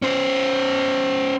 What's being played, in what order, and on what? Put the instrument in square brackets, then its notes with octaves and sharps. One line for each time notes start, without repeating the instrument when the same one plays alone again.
[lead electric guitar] C#4 C5